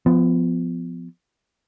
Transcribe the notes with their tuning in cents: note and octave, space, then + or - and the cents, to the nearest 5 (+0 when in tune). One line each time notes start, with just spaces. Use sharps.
F3 +0 B3 +25